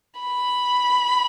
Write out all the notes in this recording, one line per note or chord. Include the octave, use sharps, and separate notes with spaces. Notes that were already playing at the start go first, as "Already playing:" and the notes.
B5